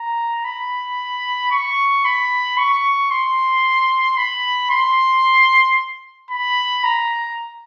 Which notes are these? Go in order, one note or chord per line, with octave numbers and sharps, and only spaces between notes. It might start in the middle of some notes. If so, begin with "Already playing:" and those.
Already playing: A#5
B5
C#6
B5
C#6
C6
B5
C6
B5
A#5